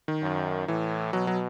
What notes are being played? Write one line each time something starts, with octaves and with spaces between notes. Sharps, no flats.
D#3
F#2
A2 E3
B2 F#3
F#3